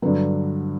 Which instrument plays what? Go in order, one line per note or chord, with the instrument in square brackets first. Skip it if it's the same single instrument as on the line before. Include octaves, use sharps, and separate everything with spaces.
[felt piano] G2 D3 F#3 B4